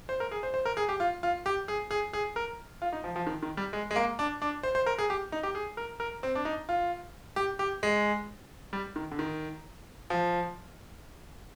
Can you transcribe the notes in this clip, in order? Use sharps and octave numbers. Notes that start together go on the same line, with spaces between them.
C5
A#4
G#4
C5
C5
A#4
G#4
G4
F4
F4
G4
G#4
G#4
G#4
A#4
F4
D#4
F3
F3
D#3
D#3
G3
G#3
G#3
A#3
D4
D4
C5
C5
A#4
G#4
G4
D#4
G4
G#4
A#4
A#4
C4
D4
D#4
F4
G4
G4
G#3
G3
D#3
D3
D#3
F3